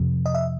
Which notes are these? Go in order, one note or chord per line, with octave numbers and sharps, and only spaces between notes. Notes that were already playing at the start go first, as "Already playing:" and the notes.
Already playing: F2 C3 F3
D#5
E5